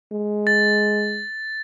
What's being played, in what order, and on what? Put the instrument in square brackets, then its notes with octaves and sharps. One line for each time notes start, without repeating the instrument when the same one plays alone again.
[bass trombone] G#3
[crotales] A6